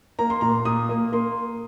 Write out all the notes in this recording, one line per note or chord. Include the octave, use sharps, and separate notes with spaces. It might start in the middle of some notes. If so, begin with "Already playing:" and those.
A#3 A#5
C6
A#2 A#5
A#2 D#6
A#3
A#3 C6